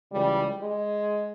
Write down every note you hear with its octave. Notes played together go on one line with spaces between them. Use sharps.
C#2 C#3 E3 G3
G#3